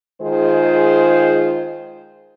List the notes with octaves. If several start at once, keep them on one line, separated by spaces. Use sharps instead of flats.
D#3 G#3 F4 G#4 C5